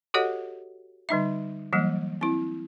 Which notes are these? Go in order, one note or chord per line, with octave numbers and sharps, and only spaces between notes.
F#4 G4 A4 C#5 D#5 F#5
D3 G3 D#4 E5
E3 F#3 G3 A#3
C4 E4